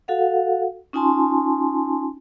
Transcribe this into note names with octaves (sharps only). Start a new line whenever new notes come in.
F#4 A4 F5 F#5
C#4 D#4 F4 G#5 A5 C6